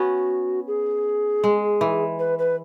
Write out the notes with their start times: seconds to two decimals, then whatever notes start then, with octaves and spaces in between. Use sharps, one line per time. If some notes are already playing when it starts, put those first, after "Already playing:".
Already playing: B3 C#4 F#4
0.67 G#4
1.44 G#3
1.81 E3
2.19 B4
2.39 B4